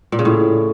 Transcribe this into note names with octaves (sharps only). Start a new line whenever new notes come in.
A#2
C#3
A2